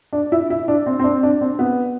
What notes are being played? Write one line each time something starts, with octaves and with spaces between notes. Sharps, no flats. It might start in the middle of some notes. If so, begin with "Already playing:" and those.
D4
E4
E4
D4
C4
C4
D4
D4
C4
B3